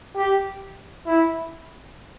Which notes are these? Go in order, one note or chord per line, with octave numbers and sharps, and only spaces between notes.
G4
E4